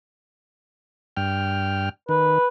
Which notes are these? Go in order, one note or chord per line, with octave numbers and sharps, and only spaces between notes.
G2 G5 F6
D#3 B4